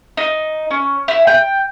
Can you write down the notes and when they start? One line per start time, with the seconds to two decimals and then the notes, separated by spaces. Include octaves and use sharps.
0.17 D#4
0.71 C#4
1.08 E4
1.27 G5